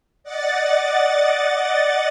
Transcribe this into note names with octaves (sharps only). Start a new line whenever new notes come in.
D5 D#5 F#5 A6